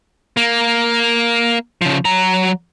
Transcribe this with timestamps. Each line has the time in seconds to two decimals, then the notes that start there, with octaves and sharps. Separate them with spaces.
0.37 A#3
1.82 C#3 F3
2.05 F#3 A#5